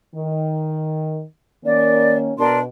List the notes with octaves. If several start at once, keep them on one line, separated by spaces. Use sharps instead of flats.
D#3
D#3 A#3 C#4 D5
B2 D4 A#4 C6